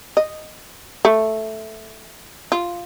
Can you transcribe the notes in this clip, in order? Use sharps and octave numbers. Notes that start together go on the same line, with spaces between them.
D#5
A3
F4